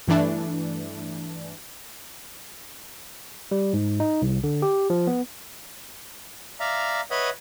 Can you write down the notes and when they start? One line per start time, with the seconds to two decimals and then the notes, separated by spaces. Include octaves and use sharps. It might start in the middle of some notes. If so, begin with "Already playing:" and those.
0.07 G2 E3 A3 D4
3.51 G3
3.73 G#2
4.00 D#4
4.22 C2
4.44 D3
4.62 G4
4.90 F3
5.07 B3
6.60 D5 E5 F5 A#5
7.11 B4 C#5 D#5 E5 F#5 D#6